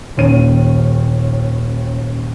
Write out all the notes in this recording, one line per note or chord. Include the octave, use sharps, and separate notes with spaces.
D#1 D#2 C#4 D#7